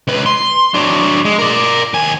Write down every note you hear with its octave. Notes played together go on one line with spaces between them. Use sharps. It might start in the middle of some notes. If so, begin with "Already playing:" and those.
C#2 B4
C6
F#3 D4
G#3
A#4 D5
D#2 G#5